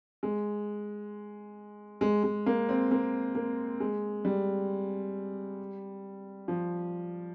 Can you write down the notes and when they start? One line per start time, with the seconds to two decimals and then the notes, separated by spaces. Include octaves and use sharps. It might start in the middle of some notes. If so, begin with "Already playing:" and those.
0.23 G#3
2.01 G#3
2.23 G#3
2.46 A#3
2.69 C4
2.91 A#3
3.35 A#3
3.80 G#3
4.25 G3
6.48 F3